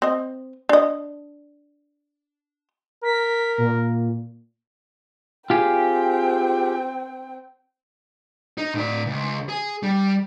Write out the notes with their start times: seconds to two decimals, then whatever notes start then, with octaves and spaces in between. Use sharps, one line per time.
0.02 C4 D#5
0.69 D4 D#5
3.04 A#4 B6
3.58 A#2
5.50 C4 F4 G4 G#4 G5
8.58 D#4
8.74 A2 D5
9.06 C#2
9.49 G#4
9.83 G3